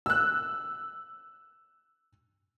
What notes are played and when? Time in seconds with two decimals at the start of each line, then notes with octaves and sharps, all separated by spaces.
0.06 E6 F#6